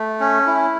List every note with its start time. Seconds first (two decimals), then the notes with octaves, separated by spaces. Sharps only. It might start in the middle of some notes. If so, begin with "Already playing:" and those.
Already playing: A3
0.20 C#4
0.47 E4